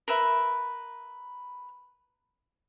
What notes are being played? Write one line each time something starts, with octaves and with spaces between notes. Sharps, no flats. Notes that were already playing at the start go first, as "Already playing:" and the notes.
A#4 B4 E5 B5